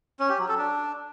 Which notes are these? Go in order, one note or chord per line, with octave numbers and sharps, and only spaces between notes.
C#4
G4
F#3
A4
D4